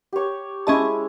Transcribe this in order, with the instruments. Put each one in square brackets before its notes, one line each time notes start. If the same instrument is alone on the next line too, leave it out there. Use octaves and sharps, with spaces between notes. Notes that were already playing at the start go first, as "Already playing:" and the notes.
[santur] G4 C#5
[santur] G#3 E4 [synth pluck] C#4 D#5 A5